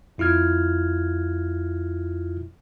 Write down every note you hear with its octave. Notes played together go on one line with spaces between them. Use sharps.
F2 E4 F4 F6 G#6